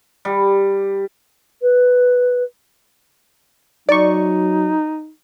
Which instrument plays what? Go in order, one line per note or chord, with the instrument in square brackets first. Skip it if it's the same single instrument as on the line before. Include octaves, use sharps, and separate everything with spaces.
[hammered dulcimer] G3
[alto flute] B4
[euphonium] F#3 [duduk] D#4 [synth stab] D5 C#6